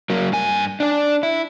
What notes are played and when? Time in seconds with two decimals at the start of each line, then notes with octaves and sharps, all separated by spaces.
0.10 F#3 A#3
0.32 G2 G#5
0.80 D4 D5
1.23 E4